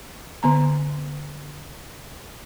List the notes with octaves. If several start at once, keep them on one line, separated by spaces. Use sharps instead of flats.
D3 B3 A#5